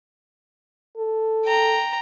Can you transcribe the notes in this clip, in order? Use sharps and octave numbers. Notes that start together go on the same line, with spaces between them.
A4
G5 A#5